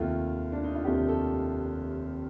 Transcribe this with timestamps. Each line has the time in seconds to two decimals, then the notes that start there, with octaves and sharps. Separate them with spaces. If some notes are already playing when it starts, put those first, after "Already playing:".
Already playing: F1 D#2 D#3 A3 F4
0.52 D4
0.64 D#4
0.74 F4
0.84 F1 D#2 D#3 A3 G4
1.08 A4